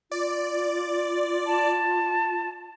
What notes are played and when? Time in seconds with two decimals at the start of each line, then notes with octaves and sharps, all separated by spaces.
0.12 F4 D5
1.46 A5